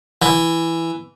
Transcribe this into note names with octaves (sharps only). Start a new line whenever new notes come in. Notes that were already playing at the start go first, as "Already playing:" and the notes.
E3